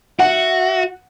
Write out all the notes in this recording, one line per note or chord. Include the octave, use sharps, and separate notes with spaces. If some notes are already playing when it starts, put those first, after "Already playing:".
F#4 E5 F#5